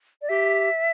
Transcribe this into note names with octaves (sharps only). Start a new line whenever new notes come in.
D5
G4 E5